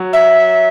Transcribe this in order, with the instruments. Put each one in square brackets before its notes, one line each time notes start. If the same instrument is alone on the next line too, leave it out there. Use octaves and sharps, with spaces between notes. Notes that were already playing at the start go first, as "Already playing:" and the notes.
Already playing: [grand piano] F#3
[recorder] E5